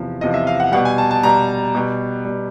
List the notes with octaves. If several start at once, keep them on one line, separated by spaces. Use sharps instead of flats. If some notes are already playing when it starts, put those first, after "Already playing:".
Already playing: E2 C3 F3
E2 C3 F3 D#5
E5
F5
F#5
B2 G3 F#5
G#5
A5
A5
B2 G3 A#5
B2 G3
B2 G3